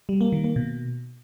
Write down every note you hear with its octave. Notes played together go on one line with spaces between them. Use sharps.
G3
A#3
D#3
A#3
B2